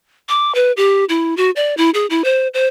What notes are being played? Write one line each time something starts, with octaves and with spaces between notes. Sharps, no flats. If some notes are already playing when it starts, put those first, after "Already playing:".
D6
B4
G4
E4
F#4
D5
E4
G#4
E4
C5
C5